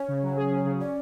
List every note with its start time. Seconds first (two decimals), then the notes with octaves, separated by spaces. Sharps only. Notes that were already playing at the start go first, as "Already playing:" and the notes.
Already playing: C#4 C#5
0.08 C#3
0.22 F#3
0.36 G#4
0.51 C#4
0.65 C#3
0.80 C#4 D5